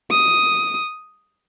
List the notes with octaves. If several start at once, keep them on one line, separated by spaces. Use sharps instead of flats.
D#6